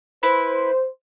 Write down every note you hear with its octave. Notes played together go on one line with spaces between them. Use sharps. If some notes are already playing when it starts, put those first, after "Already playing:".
E4 B4 C5